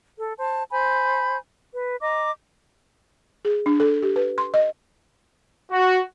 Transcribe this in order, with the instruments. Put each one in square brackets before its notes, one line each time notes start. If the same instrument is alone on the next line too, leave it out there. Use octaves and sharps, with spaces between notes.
[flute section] A4
C5 A5
C5 G#5 B5 G6
B4
D#5 A#5 D6
[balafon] G#4
D4
A4
G4
B4
C6
D#5
[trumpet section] F#4